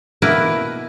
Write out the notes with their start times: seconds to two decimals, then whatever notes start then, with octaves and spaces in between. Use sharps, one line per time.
0.22 B2 A#3 E4 A#4 B4